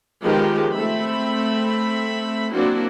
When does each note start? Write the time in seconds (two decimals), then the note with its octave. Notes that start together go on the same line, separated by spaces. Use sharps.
0.22 D#3 F3 G#3 B3 G4 A#4
0.71 A3 C4 E5 B5
2.53 F#3 A#3 C4 D4 E4 F#4